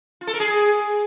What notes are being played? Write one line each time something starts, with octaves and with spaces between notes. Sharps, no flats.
F4
A4
A#4
G#4